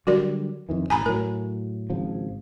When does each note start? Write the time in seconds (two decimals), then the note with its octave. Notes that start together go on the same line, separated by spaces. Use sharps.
0.07 D3 F#3 G3 F#4 A#4 D5
0.69 F2 D#3 E3
0.90 A1 G#5 A#5 B5
1.06 A2 F#3 A#4
1.90 G#1 C#3 F3